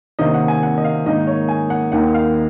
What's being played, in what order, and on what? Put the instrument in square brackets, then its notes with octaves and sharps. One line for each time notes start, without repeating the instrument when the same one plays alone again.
[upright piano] C3 D#3 A#3 C#4 D#5
F#5
G#5
F#5
D#5
F5
G#2 D#3 A#3 D#4 D#5
C#5
G#5
F#5
D#2 D#3 A#3 D#4 F#5
F5